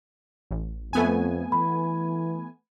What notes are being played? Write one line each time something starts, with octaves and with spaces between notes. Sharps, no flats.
A1
F2 A3 B3 G#5
E3 B5